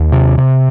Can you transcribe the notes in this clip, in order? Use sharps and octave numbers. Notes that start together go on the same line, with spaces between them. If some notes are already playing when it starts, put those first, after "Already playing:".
Already playing: D#2
C3
C3